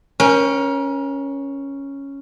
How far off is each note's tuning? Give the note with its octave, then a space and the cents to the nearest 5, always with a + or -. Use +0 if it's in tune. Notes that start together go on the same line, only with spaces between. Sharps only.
C#4 +0 A#4 +35 G5 +20